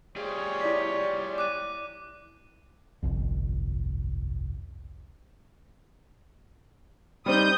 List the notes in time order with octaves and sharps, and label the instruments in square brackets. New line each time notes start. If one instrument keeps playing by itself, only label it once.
[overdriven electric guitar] G3 G#4 [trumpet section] F4 C5 C#5
[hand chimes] E4 D5 B6
[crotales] D6 F#6 D#7
[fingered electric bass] G1 C2 F2
[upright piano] G3 C4 D#4 [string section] D#6 G6